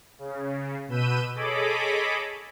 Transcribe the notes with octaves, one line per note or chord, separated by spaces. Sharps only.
C#3
B2 B4 E6 G6 D#7
G#4 A4 C#5 D#5 B5 D6